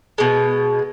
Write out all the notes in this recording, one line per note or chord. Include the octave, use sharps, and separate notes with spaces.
B2 G#3